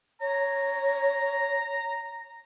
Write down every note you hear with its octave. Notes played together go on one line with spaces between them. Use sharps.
C#5 A#5